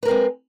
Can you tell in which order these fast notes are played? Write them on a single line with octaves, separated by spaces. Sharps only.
B4 A#4 C4 G#3